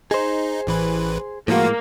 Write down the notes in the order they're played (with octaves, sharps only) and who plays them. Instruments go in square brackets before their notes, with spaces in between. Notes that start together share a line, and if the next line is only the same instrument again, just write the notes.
[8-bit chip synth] D#4 [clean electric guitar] G#4 C5
[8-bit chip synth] A1 E3 B4
[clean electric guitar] A2 G#3 [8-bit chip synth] F3 F4 F#4 [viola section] A#3